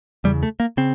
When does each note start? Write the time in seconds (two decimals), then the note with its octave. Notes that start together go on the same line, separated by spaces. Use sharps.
0.24 E2 C#3 G3
0.43 A3
0.60 A#3
0.77 C#3 C4